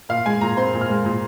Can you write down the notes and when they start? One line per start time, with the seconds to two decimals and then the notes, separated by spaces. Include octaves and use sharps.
0.09 A#2 F5
0.26 G#3 G#5
0.41 A#2 A#5
0.57 C4 C6
0.74 A#2
0.81 F6
0.90 G#3
1.05 A#2